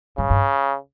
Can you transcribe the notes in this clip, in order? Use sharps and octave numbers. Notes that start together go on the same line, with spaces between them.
G2 C#3
G2